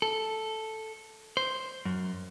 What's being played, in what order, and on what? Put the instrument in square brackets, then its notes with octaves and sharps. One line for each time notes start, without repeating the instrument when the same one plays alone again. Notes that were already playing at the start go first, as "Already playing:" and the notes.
[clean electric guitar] A4
C5
F#2